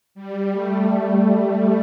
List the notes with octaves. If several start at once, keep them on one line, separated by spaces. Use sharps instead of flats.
G3
A3